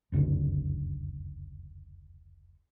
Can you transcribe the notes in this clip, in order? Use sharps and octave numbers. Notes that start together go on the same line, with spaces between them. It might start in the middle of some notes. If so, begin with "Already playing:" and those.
F1 C#2 F#2 D3